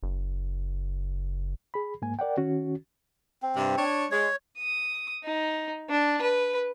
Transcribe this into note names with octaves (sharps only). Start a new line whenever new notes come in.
F#1
G#4 B5
G#2 A#3 G#5
A#4 D5 F#5 G5
D#3 C#4 F#4
C4
G2 C3
D4 C#5
G#3 C#5
D#6
D#4
D4
B4